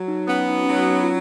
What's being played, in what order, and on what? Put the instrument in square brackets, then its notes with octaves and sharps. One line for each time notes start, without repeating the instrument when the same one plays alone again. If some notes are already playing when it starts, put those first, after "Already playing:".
Already playing: [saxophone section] F#3
[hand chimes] D#4
[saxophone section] B3 [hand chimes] C#4
[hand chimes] D#4
C#4
[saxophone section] F#3 [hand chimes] D#4
[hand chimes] C#4
F4